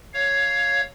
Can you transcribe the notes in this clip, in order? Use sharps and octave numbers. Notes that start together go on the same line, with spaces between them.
C#5 F5